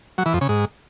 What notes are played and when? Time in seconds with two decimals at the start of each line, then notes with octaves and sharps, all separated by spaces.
0.18 F#3
0.26 E3
0.33 F2
0.41 C#3
0.49 G#2